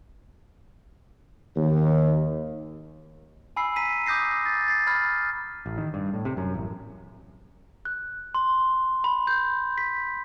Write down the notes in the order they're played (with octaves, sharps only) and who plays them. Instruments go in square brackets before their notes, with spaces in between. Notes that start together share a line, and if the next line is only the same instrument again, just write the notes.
[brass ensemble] D#2
[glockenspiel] G#5 B5 E6 C7
A#5 B6 D#7
D6 D#6 G6 A#6 C7
A6
A6 C7
B5 F6 G#6
[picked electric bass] A1
D#3
G2
A2
C3
F#2
A1
[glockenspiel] F#6
C6
B5
G6
B6